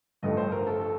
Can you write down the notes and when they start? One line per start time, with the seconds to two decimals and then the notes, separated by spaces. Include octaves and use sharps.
0.23 A1 G2 F3 A3 D#5
0.37 C5
0.52 A#4
0.67 A4
0.81 A4